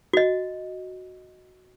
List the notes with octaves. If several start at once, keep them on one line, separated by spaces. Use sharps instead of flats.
F#4 D#5